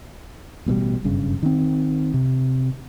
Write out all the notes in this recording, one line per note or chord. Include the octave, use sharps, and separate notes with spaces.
A1 B2 D#3 G3
F#1 G2 C#3
D#3 C4
C3